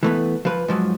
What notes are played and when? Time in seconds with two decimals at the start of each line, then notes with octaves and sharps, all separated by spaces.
0.03 E3 A3 B3
0.45 F3 B4
0.68 G#2 F3 F#3